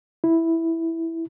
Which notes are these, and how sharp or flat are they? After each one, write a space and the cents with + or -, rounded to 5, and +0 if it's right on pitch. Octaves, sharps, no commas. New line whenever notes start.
E4 -5